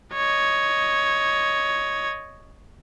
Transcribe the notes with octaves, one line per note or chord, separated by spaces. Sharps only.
C#5 D#5